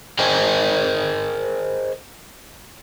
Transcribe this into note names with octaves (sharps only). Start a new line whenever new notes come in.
G#4 A#4 C5 D#5 G5 G#5